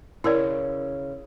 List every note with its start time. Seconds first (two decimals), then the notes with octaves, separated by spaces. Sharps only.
0.24 C#3 E4 A#4 D5